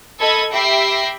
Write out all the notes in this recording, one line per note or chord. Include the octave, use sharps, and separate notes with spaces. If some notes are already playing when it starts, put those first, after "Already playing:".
A4 D#5 B5 E6 G#6
G4 E5 G5 B5 A#6 C7